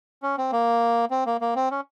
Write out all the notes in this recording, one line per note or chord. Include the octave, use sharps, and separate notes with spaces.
C#4
C4
A#3
C4
A#3
A#3
C4
C#4